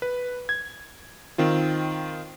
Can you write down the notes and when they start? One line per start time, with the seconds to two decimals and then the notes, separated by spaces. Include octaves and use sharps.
0.02 B4
0.49 G#6
1.38 D#3 C4 F4